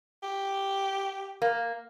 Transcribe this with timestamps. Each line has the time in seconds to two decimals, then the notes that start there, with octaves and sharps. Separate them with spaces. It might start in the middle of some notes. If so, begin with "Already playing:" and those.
0.23 G4
1.42 A#3